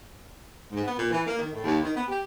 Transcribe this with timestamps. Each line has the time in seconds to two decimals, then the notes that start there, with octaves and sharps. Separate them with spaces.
0.71 G#2
0.84 B3
0.97 A#2
1.10 E3
1.26 A#3
1.39 D#3
1.52 A2
1.64 D#2
1.83 D#3
1.95 B3
2.08 G4